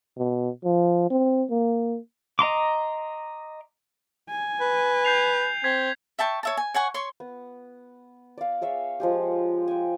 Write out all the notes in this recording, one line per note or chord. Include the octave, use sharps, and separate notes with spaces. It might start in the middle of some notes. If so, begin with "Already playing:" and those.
B2
F3
C4
A#3
D#5 A#5 C6 D6
G#5
B4
G6 C7 F7
C4 G#6 B6
E5 G5 A5 C#6
C#5 E5 A5
G#5
C#5 F#5 G#5 C#6
C#5 C6 C#6
B3
D5 F5
G#4 C#5 E5 F5
F3 G#3 G4
G5 G#5